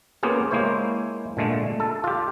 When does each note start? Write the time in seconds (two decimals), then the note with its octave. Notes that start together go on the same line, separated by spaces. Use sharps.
0.23 A#3 B3 C#4 F4 G4 G#4
0.51 G#3 A#3 E4 C5 C#5
1.37 A#2 D3 G#3 A3
1.80 A4
2.04 F4 G4